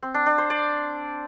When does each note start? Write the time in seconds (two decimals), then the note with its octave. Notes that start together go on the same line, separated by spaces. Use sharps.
0.02 C4
0.14 D4
0.26 D4
0.38 C5
0.50 D5